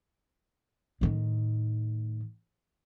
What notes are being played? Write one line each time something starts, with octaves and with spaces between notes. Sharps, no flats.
A2 D#3